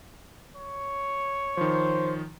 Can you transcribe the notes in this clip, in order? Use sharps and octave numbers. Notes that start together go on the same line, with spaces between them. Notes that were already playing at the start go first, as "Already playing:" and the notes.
C#5
D#3 F3 C5